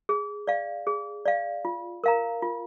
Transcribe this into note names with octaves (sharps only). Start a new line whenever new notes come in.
G#4
D5 F5
G#4
D5 F5
F4
A#4 F5 A#5
F4